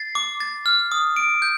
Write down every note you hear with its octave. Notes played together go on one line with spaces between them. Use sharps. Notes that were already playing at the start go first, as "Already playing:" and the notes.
Already playing: A6 C7
D6
A6
F6
D#6
D7
G6